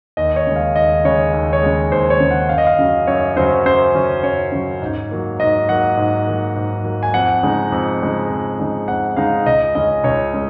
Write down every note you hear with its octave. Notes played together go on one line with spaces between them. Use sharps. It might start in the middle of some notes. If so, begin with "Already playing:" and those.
D#2 D#5
C#5
C#3 G#3
F5
D#2 D#5
C#3 G#3 C#5
D#2
C#5
C#3 G#3
D#2 C5
C#5
C#3 G#3
F#5
F#2 F5
D#5
F5
C#3 F#3 C#4
F#2 C#5
C#3 F#3 C#4 C5
F#2 C5
C#3 F#3 C#4
F#2 C#5
C#3 F#3 C#4
G#2
F#3 A#3
G#2 D#5
F#3 A#3 F#5
G#2
F#3 A#3
G#2
F#3 A#3
G#5
F2 F#5
C#3 G#3 D#4
F2
C#3 G#3 D#4
F2
C#3 G#3 D#4
F2 F#5
C#3 G#3 D#4 F5
C#2 D#5
C#3 G#3 C#4 D#5
C#2 C#5
G#3 C#4